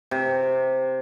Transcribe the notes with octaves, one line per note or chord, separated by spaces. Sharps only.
C3